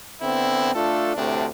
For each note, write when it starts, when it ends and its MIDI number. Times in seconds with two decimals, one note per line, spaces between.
0.22 0.71 50
0.22 0.71 59
0.22 0.71 60
0.22 0.71 64
0.74 1.14 57
0.74 1.14 62
0.74 1.14 65
0.74 1.14 69
1.17 1.46 38
1.17 1.46 45
1.17 1.46 48
1.17 1.46 62